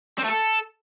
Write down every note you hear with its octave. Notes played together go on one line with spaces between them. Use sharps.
C4
A3
A4